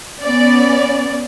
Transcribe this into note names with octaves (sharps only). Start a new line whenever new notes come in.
B3 C#4 D5